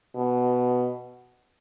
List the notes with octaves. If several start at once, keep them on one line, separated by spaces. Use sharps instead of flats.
B2